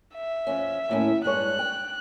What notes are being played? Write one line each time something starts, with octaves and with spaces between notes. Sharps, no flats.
E5
F2 C#4
D#2 A2 C#4
G2 G#3 C#5 F#6
G5